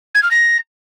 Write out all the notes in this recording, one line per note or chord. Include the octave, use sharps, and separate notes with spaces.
G#6
F6
A#6